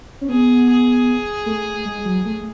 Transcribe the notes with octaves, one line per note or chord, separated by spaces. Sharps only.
C#4
B3 G#4
G#4
A3
G#3
F#3
A3